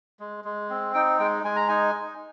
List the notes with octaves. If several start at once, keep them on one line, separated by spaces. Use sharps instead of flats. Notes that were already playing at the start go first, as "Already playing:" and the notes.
G#3
G#3
C4
D#4 G5
G#3 G5
G#3 G#5
A#5
D#4 G#5
D#4